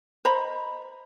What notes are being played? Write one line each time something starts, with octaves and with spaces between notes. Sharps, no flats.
C5 D#5 A#5 B5